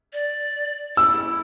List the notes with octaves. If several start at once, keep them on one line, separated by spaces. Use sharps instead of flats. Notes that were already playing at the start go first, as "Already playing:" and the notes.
D5
E4 E6